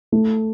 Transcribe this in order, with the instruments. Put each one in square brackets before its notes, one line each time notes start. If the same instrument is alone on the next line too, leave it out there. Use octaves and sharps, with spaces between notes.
[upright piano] A3